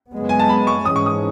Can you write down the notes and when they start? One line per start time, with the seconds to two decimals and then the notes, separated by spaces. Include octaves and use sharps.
0.12 F#2 C#3 G#3 B3
0.29 G#5
0.39 A5
0.49 B5
0.67 C#6
0.85 G#2 E3 G#3 C#4 D#6
0.96 C#6
1.06 D#6